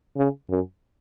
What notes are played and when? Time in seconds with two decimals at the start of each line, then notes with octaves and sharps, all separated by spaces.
0.17 C#3
0.49 F#2